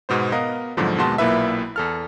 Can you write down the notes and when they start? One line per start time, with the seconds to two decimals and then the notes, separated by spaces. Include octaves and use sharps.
0.09 G#2 B2 B3 C5
0.32 B3 A#4 D#5 F5 F#5
0.77 F2 G#2 B2 D3 F3 F#3
0.98 D#2 B2 G#3 F#4 A5 C6
1.18 B1 A#2 A#3 E4 B4 E5
1.76 E2 A4 F6